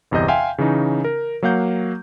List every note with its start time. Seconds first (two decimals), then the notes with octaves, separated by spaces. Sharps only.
0.11 G1 E2 C3 D#5 G6
0.28 E5 F5 G5 G#5 C6
0.58 C#3 E3 C#4 D#4
1.04 A#4
1.42 F#3 A#3 F5 F#5 G6